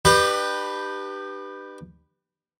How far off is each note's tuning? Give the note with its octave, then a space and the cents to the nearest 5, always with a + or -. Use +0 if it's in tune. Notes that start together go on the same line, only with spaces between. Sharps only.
D4 +45 G4 +0 B4 +0